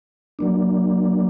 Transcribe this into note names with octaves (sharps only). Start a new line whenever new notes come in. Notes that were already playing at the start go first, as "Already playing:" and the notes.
F#3 A#3 D4